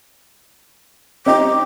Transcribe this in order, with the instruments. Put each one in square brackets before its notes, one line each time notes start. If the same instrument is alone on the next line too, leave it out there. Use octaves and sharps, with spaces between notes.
[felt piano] C4 D#4 G4 [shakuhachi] D6